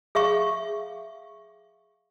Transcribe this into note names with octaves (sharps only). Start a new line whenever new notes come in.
G#4 E5 F5 C#6